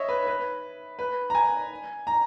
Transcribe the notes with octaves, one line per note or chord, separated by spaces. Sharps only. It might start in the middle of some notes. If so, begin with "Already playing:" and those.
Already playing: C#5 D#5 E5
B4
B4
B4
A#5
G#5
A#5